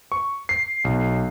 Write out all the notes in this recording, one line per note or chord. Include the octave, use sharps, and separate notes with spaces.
C#6
C7
B1